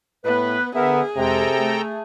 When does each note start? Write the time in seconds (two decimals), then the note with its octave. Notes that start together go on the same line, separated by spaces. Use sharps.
0.25 A2 B3 B4
0.75 D3 B3 G#4 A#4 E5
1.16 F2 C3 G#3 A4 G5 A#5
1.59 A3